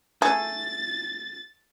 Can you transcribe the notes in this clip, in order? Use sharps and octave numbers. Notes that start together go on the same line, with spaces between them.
A3 G#4 A6